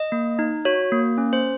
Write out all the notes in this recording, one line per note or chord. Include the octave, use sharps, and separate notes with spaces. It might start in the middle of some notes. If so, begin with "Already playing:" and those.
Already playing: D#5
A#3
D#4
F#4 C#5
A#3
C#4
C5